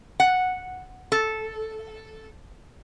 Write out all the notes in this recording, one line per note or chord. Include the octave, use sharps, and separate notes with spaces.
F#5
A4